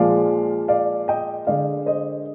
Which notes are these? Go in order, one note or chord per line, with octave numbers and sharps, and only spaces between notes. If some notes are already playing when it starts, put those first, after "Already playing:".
Already playing: A#2 F3 G#3 D5 F5
D5 F5
D#5 G5
D3 G#3 D4 D5 F5
C5 D#5